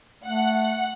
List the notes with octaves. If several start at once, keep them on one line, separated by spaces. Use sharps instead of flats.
A3 F#5